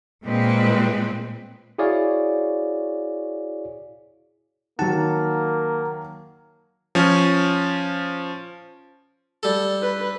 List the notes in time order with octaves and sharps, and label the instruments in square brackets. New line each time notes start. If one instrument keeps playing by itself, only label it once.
[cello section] A#2 G#3 C4 B4
[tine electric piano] E4 F#4 G#4 C#5 D5 F5
[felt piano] D#3 F#3 [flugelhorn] A#3 [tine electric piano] F#5 A5
[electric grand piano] F3 C#4
[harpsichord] G3 A4
[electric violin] B4